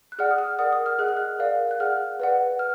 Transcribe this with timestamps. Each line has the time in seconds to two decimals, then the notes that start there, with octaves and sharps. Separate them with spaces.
0.12 F#6
0.19 G#4 D5 F#5 F6
0.31 D#6
0.38 F6
0.59 A#4 D5 F#5 D#6
0.73 D#6
0.86 F6
0.99 G#4 D#5 F#5 F#6
1.09 F6
1.17 F#6
1.39 A#4 D5 F5
1.71 F#6
1.79 G#4 D5 F#5 F6
2.20 B4 D5 F#5
2.59 F6